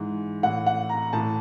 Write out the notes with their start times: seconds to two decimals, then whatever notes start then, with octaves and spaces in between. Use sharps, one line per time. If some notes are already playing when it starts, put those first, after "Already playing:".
Already playing: G#2 E3
0.43 A2 E3 F#5
0.66 F#5
0.89 A#5
1.13 A2 E3 A5